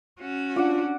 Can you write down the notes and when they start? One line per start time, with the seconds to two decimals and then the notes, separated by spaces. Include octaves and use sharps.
0.21 C#4 F#4
0.56 D4 F4 D5 F#5